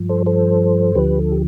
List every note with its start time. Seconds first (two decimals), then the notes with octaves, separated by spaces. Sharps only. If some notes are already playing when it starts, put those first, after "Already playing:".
Already playing: G2 F3
0.09 A4 C5
0.26 A4 C5
0.95 D2 D3 F3 G4 B4
1.19 A4
1.32 G4